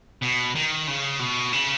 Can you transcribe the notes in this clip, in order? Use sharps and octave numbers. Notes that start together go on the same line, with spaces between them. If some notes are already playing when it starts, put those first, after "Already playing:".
B2
D#3
C#3
B2
C#3